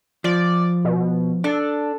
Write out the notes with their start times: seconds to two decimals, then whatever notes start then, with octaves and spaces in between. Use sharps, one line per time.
0.24 F3 D5
0.85 B2
1.44 D4 A4